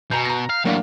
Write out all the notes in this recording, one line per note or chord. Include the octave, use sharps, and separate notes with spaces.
B2 G#5 A#5 G6
A#5 A#6
F5
F#2 A2 A#3 D4 F5